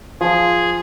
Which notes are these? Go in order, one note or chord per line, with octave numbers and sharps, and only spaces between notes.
F3 G#4